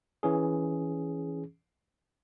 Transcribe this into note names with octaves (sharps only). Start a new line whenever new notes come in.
E3 C#4 G#4